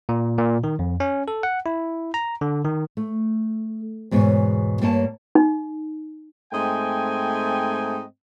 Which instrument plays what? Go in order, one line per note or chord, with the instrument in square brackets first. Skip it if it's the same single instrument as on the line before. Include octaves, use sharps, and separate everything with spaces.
[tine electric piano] A#2
A#2
D#3
F2
C#4
A4
F#5
E4
A#5
D3
D#3
[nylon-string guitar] A3
E2 G#2 B2 C#5
G2 A#3 C#5 A5
[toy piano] D#4
[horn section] G#2 A3 C4 D#5 G5 G#5